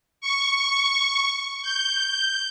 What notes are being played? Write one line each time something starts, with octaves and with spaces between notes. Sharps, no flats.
C#6
G6